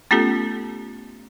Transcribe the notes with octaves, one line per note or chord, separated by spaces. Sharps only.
A3 B3 C#4 F4 G4 A4